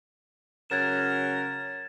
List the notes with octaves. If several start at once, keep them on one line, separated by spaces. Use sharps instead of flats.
C#3 F#3 A#4 G#6 A6 E7